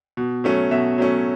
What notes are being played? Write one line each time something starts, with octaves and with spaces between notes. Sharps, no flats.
B2
F#3 A3 C#4
B2 E5
F#3 A3 C#4